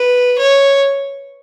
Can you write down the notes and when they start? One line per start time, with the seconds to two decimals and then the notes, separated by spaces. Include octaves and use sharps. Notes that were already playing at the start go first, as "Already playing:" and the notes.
Already playing: B4
0.38 C#5